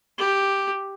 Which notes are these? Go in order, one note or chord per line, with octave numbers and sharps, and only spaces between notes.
G4